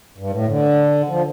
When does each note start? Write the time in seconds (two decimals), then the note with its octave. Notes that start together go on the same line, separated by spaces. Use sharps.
0.18 G2
0.32 A2
0.48 D3
1.09 F3